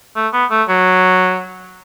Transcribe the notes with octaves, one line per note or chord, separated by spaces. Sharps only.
A3
B3
A3
F#3